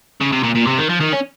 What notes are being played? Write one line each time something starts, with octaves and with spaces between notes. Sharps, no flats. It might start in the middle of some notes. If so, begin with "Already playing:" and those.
C#3
C3
A#2
A#2
C3
D#3
F3
D#3
C#4